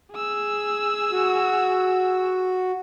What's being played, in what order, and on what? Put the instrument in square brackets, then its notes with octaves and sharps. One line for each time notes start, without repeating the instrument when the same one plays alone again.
[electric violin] G#4 E6
[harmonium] F#4